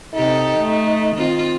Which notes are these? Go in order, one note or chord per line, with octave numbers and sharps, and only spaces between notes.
C3 D#4 G4 A4
A3
D#3 C4 F4